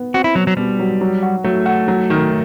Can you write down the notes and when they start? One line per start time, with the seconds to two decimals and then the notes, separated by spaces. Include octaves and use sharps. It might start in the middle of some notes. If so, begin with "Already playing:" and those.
Already playing: B3
0.14 C4 F#4
0.24 E4
0.35 B2 F#3
0.47 F#3
0.57 B2 G3
0.79 F#3
1.01 F#3
1.23 F#4
1.44 F#3 A3
1.66 F#4
1.88 F#3
2.10 D#3